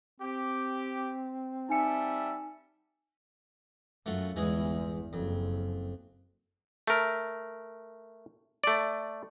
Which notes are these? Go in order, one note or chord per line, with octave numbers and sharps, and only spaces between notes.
C4 G4
G3 D#4 E5 G#5 A5 C#7
F#2 A3 F4 F#4
G1 E2 E3 G#3 G#4
F#1 F2
A3 A#4
A3 D5